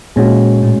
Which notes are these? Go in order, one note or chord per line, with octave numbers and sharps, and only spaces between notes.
A#2 G#3 C#4 F#4
A2